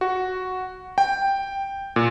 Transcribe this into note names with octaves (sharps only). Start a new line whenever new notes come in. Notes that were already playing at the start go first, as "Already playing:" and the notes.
F#4
G5
A#2